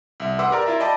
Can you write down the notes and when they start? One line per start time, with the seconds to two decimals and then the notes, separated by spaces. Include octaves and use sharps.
0.20 C2 E5
0.39 B4 F#5 C6 D6 E6
0.51 G4 A#4 D5 A#5
0.66 E4 F4 E5 A#5
0.80 D5 D#5 G5 A5 B5 D6